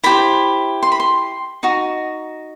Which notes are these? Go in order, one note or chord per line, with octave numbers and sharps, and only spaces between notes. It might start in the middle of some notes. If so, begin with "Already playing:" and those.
E4 G4 C5 B5
C6
B5
C6
D#4 F#4